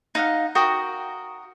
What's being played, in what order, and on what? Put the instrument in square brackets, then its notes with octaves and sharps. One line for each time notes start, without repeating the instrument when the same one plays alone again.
[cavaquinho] D#4 F5 F#5
F#4 A#4 G5 D#6